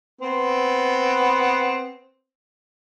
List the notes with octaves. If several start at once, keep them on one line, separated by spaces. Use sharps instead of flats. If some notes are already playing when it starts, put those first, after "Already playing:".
B3 C4